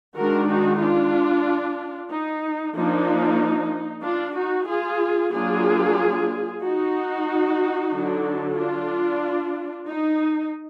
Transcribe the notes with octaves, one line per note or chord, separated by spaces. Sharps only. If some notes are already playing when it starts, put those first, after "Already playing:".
D#3 G#3 D4 F#4 A#4
D#4 F#4
D4 F4
D#4
F3 A#3 D4 D#4
D4 F4
D#4 F#4
F4 G#4
F#3 A#3 D4 F4 G#4
D#4 F#4
D3 F#3 D4
D4 F4
D#4